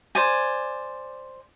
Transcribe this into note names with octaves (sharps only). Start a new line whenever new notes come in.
C5 D5 G#5